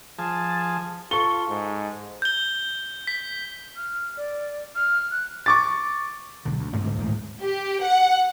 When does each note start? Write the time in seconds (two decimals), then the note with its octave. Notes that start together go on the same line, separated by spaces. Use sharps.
0.19 F3 G#4 A5
1.11 F4 A4 C#6 G7
1.48 G#2
2.22 G6 G7
3.07 B6
3.76 F6
4.17 D5
4.75 F6
5.11 F#6
5.46 C#6 D6 A6
6.45 B1 D3
6.59 D2
6.73 A1 D2 G2 C4
6.86 C#2 G#2
6.98 D1 A2 D#3 G#3
7.41 G4
7.82 F#5